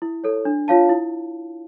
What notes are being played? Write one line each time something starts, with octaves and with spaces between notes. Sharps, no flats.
E4
A4 C#5
D4
F4 C#5 F5 A5
E4